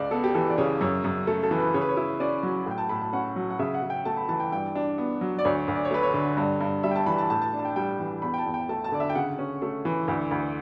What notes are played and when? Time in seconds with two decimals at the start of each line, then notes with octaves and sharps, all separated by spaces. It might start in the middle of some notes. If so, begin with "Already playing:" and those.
Already playing: C#2 D5
0.11 B3 A4
0.24 G4
0.34 E3 A4
0.50 D5
0.58 C#3 C#5
0.81 F#2 C#5
1.04 F#2
1.27 A3 A4
1.43 A4
1.51 E3
1.59 B4
1.74 C#3 C#5
1.81 B4
1.89 C#5
1.97 E4
2.20 C#4 D5
2.43 F#3
2.66 A2 G5
2.78 A5
2.89 A2 B5
3.01 A5
3.13 C#4 F#5
3.36 F#3
3.50 F#5
3.59 C#3 E5
3.74 F#5
3.83 C#3
3.90 G5
4.05 A3 A5
4.17 B5
4.29 E3 A5
4.40 G5
4.52 G2 G5
4.75 D4
4.98 B3
5.21 F#3
5.39 D5
5.45 D2 C#5
5.68 D2
5.75 D5
5.85 C#5
5.91 A3 B4
6.03 C#5
6.14 D3
6.37 G2
6.61 G2
6.83 G3 E5
6.91 G5
6.95 A5
7.06 E3 B5
7.18 A5
7.30 A2 A5
7.42 A5
7.53 D4
7.59 A5
7.65 G5
7.76 G3 G5
7.99 E3
8.22 E2 B5
8.34 G5
8.38 A5
8.46 E2
8.54 G5
8.69 A3 A5
8.84 A5
8.92 D3 D5
9.00 E5
9.10 G5
9.15 C#3 F#5
9.39 C#4
9.62 A3
9.85 E3
10.08 D2
10.31 D2